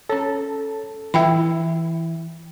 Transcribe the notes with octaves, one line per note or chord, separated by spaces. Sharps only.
C#4 A4 C#5 A5
E3 E4 E5 G5 B5